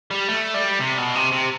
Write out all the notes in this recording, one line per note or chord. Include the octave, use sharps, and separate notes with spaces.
G3
A3
G3
C3
B2
C3
C3